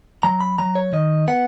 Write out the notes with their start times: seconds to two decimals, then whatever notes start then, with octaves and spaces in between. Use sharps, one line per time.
0.23 F#3 A#5
0.41 B5
0.58 F#3 A#5
0.75 C#5
0.93 D#3 D#5
1.28 B3 F#5